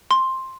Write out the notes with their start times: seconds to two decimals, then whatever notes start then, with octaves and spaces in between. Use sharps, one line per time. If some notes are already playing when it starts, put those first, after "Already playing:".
0.11 C6